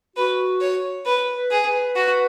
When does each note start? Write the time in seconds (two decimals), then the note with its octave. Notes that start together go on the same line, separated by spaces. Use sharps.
0.16 F#4 B4
0.61 C#5
1.06 B4
1.36 B4
1.51 G#4
1.67 B4
1.96 F#4